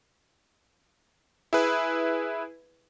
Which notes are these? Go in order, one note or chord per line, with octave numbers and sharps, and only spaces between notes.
E4 G#4 B4